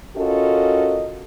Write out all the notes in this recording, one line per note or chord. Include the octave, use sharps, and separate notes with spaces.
C#4 F4 F#4 A4 A#4 D#5